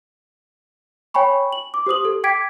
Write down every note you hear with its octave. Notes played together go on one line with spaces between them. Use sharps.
C#5 G5 G#5 B5 C#6
F#7
D6
G4 C5 D#6 F#7
A4
G5 D6 G#6 B6 D7